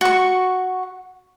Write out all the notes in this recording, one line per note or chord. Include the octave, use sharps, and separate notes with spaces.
F#4 C#6